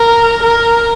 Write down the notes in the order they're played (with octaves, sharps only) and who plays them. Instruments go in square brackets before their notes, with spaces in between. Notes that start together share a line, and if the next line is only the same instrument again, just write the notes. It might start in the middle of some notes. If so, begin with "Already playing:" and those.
Already playing: [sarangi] A#4
A#4